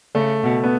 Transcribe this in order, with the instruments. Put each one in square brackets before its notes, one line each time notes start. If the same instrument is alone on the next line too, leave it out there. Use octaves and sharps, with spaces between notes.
[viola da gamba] C#3 [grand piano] A3
[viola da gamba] B2
[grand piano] B3